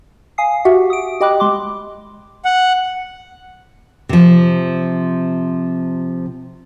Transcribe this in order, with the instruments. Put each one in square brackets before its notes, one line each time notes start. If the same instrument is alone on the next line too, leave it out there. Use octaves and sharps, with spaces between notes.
[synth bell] F5 G#5 D#6 C7
F#4 G4 E5 F#5
D#6 D7
G4 D#5 G5 B5 D6 F#6
G#3 C6 D6
[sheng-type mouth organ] F#5
[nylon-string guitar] C3 F3